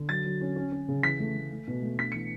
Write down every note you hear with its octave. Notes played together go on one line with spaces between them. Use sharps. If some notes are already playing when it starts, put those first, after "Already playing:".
Already playing: D3
F#3 A6
F#3
C#4
C#4
C#4
C#3
E3 B6
A3
A3
A3
B2
A3
D4 B6
E3 C#7